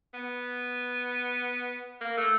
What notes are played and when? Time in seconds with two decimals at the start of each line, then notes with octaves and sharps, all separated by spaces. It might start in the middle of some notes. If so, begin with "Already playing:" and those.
0.14 B3
2.01 A#3
2.17 A3